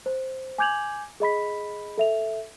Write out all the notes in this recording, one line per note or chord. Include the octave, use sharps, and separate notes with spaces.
C5
G#5 D6 G6 G#6 F7 F#7
G#4 D#5 B5 B6
A4 E5 F7